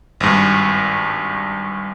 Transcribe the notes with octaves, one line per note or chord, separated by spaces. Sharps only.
G#1 G2